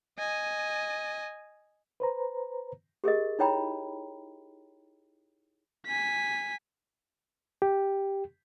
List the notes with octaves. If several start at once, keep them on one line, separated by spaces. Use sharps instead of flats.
D#5 G#5
B4 C5 A#5
G4 G#4 A#4 D#5
D#4 E4 C#5 G5 A#5 B5
G#5 B6
G4